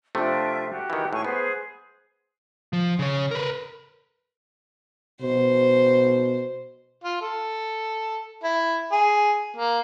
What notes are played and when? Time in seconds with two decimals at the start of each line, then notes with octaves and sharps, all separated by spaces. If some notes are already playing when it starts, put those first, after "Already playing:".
0.15 C3 F3 A3 D4 F4 E5
0.68 F#4 G4
0.90 D#3 E3
1.13 A2 G#4 G#5 C#6
1.24 B3 G#4 B4 C5
2.73 F3
2.99 C#3 C#5
3.31 A#4 B4
5.21 B2 C5
7.04 F4
7.21 A4
8.44 E4
8.92 G#4
9.57 A#3